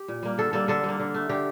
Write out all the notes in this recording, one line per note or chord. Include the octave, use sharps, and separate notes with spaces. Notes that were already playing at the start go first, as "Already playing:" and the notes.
Already playing: G4
A#2
G3 A#3
D3 A4
G3 A#3 A4
D3 A4
G3
A#3
D3
A3
D3 G4